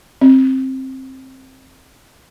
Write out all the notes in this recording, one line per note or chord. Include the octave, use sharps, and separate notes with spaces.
C4